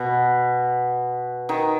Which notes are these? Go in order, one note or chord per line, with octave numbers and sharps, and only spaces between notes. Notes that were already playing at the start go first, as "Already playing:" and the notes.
Already playing: B2
D#3